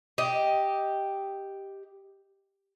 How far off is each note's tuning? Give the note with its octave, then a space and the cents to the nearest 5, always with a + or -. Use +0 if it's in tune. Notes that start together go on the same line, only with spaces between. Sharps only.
G4 +0 D#5 +10